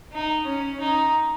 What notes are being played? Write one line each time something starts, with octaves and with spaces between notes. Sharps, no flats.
D#4
C#4
D#4